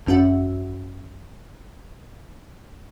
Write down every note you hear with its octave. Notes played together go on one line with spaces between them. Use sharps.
G#1 F#2 C#4 F#4 E5